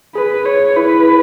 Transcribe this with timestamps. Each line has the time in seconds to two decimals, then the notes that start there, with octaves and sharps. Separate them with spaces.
0.15 G#4 B4
0.45 C#5
0.76 E4 B4